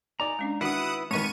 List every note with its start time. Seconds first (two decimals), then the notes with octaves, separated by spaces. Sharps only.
0.20 D#4 D5 G#5 A#5
0.39 G#3 C#4 D4
0.61 D#3 D4 E4 F#4 B4 F#5 D#6
1.11 G#2 D#3 C4 B4 C#5 D#5 C#6 D#7